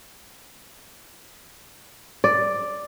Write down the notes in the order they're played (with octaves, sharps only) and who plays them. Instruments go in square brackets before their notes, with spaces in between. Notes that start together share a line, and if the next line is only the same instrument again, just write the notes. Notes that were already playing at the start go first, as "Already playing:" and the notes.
[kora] D5